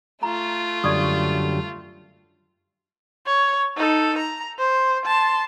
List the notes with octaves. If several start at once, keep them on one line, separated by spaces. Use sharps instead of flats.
A3 F4 A#5
F#2 D3 G3 D5 C#6 D#6
C#5
D#4 A4
A#5
C5
A5 C6